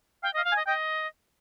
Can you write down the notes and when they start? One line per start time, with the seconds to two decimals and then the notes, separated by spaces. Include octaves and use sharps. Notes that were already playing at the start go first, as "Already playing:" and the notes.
0.23 F5 G5
0.33 D#5 F5
0.44 F5
0.52 G#5
0.56 D#5
0.67 D#5 G5